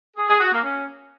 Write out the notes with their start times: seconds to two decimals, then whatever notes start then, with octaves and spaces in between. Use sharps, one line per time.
0.17 G#4
0.29 G#4
0.41 F#4
0.52 A#3
0.64 C#4